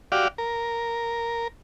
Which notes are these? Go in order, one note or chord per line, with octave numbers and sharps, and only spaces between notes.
F#4 G4 D5 F5
A#4